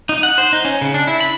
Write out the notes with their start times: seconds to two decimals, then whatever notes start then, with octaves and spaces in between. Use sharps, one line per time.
0.09 D#4
0.23 F#5
0.38 C5
0.53 D#4
0.65 C#4
0.81 C#3
0.94 D4
1.07 E4
1.21 B5